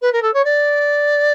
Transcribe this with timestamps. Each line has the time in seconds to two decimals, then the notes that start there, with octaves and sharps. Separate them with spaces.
0.01 B4
0.12 A#4
0.22 A4
0.34 C#5
0.45 D5